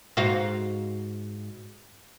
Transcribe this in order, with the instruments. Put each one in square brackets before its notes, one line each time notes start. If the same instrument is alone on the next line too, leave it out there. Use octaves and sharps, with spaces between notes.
[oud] G#2 F#4 F5